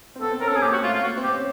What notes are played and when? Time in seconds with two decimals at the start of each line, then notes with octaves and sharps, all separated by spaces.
0.16 C4
0.21 B3 A4
0.31 C4
0.41 C#4 A#4
0.48 A4
0.52 C4
0.56 G#4
0.62 A#3 G4
0.73 F#4
0.83 A3 F4
0.93 F4
1.03 A#3 F#4
1.17 C4
1.24 G4
1.32 C#4